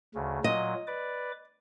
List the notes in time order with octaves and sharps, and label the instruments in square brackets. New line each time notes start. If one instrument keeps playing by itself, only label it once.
[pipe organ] D2 C#3
[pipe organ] A#2 F#3 [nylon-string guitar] D#5
[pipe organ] B4 D5 D6